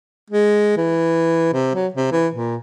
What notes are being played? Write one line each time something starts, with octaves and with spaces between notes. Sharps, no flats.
G#3
E3
C3
F#3
C3
E3
A#2